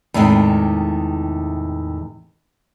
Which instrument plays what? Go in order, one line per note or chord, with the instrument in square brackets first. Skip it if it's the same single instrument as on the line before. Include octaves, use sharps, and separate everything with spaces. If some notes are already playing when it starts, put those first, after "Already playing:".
[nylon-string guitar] E2 A2 C3 D#3 G#3